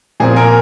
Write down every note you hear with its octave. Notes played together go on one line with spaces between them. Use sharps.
A#2 F3 C4 G#4
A#4